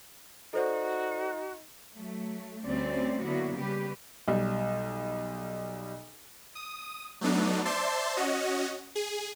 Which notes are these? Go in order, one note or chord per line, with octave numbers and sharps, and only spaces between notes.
D#4 F#4 A4 C5 D5
F#3 A3
D2 G3 C4 C#4 D5
D3 F#3 A#3 B3 E4 F#4
C#3 G3 G4 B4
B1 G3
D#6
F#3 A3 B3 D4 D#4
C5 D5 E5 A5 C6
C#4 F#4 D#5
G#4